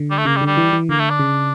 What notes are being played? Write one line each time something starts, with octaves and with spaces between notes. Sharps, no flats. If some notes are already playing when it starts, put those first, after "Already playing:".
Already playing: D3
G3
A3
C#3 A#3
G3
D3
G3
E3
E3
D3 A#3
A3
D4
C#3